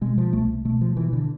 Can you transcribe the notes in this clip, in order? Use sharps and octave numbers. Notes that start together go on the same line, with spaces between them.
B2 G#3
F3
C2 A3
B2 A3
F3
B2 E3
D3